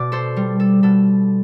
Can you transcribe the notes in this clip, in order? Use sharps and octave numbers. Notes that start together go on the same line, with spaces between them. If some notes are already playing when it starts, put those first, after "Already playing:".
Already playing: B2 D5
A4 C5
G3
A4
B2 A4